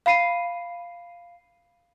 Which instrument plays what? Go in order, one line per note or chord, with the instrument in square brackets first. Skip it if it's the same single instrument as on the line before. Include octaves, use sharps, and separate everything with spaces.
[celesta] F5 B5 C7 D#7